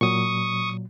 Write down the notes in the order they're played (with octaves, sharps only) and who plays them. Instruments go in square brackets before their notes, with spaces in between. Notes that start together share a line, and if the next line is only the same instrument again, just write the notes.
[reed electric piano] A#2 F#3 [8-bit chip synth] C#6 D#6